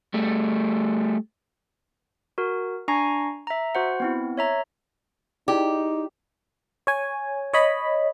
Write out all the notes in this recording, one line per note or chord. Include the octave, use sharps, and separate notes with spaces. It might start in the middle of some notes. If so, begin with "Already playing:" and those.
G3 A3
F#4 A#4
D4 G#5 A#5 C#6 A#6 C7
E5 A#5
F#4 C5 F#5
B3 C4 E4
C#5 E5 A#5
D#4 E4 G4 G#4 D5
C#5 G#5
C#5 D#5 B5